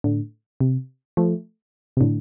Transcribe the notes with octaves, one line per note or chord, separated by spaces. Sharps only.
A2 D3
C3
F3 A3
C3
A2 D3